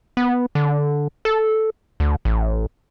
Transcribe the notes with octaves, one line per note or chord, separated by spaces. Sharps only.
B3
D3
A4
D2
A1